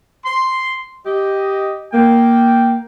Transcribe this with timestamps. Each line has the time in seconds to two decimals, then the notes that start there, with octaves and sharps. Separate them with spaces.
0.24 C6
1.06 G4 D#5
1.93 A#3 G5